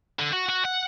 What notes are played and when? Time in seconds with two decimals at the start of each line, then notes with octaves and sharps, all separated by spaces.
0.19 D3
0.32 F#4
0.49 F#4
0.65 F#5